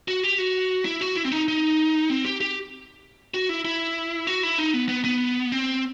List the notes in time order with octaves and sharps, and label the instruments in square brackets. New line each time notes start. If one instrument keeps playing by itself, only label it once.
[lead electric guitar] F#4
G4
F#4
E4
F#4
E4
C4
D#4
D#4
C4
G4
G4
F#4
E4
E4
F#4
E4
D#4
B3
B3
B3
C4